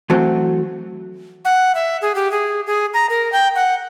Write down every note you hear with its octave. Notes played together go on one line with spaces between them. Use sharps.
E3 F#3 A3 C4 F#4 C5
F#5
E5
G#4
G4
G#4
G#4
A#5
A#4
G5
F#5